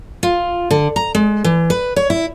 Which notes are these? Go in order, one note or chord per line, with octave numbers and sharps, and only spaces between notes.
F4
D3
A#5
G#3
E3
B4
C#5
E4